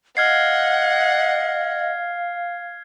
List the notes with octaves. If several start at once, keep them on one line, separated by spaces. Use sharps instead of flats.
D#5 F5 F#5 F6 G#6 C7